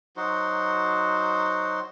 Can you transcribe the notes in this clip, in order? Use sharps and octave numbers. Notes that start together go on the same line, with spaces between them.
F#3 D#4 F#4 C5